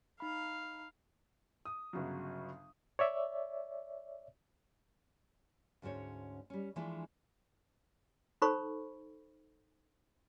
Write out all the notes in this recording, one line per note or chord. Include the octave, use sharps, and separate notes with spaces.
D#4 F5 B5
D#6
G1 C#3 F#3
C#5 D5 E5
D2 G#2 C#4 C5 C#5
G3 C#4
E3 F3 G#3 A3 D4
D#4 A4 C5 B5 C#6